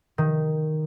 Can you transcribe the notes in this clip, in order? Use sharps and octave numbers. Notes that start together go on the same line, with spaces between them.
D#3